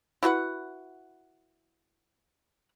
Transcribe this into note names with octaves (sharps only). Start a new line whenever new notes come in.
E4 F#4 B4 F#5